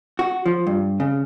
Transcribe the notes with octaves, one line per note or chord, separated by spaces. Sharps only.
F#4
F3
G2
C#3